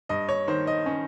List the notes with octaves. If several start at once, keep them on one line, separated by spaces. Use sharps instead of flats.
G2 D#5
C#5
D#3 C5
D#5
C#4